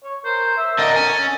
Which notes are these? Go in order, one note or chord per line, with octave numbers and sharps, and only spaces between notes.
C#5
A#4 C5
E5
D3 A#4 D#5 A5
C#4 G#5